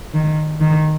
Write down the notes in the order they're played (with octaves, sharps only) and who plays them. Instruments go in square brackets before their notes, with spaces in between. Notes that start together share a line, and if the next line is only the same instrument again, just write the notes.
[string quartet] D#3
D#3